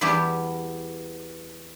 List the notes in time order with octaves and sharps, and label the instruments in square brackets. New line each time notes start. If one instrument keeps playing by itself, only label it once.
[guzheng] E2 G3 B3 E4 G4